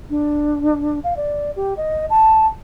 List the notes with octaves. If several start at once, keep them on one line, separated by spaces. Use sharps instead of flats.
D4
F5
D5
G4
D#5
A5